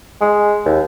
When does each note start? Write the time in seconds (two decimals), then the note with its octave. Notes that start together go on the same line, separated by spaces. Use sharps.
0.21 G#3
0.65 D#2